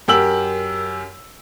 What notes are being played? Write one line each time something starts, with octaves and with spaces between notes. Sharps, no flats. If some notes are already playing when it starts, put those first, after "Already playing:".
F#2 G4 A#4 E6 F#7